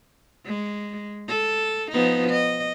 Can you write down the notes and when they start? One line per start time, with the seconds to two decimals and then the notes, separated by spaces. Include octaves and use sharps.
0.46 G#3
1.29 A4
1.92 F3 B3 D#4
2.30 D#5